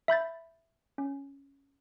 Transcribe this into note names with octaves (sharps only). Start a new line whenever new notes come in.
E5 B5 G6 A6
C#4